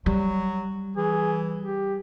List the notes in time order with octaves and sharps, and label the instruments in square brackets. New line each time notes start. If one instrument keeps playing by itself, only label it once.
[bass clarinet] F#3 [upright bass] G3
[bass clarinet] E3 [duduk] G#4
[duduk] G4